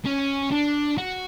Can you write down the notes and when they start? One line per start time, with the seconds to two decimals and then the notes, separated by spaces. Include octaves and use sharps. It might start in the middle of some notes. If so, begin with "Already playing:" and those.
0.05 C#4
0.51 D4
0.98 F#4